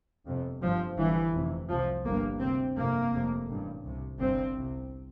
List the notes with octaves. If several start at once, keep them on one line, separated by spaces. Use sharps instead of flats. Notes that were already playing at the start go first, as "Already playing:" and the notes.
G1 F2 C3
G1 G2 F3
G1 G2 E3
F1 F2 C3
C2 C3 F3
G1 G2 A#3
D2 C3 C4
G1 F2 C3 A#3
F1 F2 C3
A1 G2
C2 C3
G1 G2 C4
C2 C3